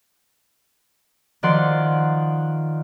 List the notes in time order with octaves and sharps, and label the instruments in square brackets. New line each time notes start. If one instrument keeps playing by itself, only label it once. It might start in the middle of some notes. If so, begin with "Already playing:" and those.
[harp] D#3 F3 D5 F#5 C6